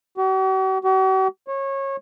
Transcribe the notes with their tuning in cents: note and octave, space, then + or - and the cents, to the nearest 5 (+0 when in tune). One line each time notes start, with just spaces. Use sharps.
F#4 +45
F#4 +45
C#5 -25